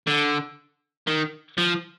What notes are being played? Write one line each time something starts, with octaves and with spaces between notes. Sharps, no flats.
D3
D#3
F3